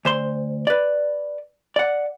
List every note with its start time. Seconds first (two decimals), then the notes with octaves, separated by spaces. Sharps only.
0.05 D2 C5 C6
0.67 B4 D5
1.76 D5 F#5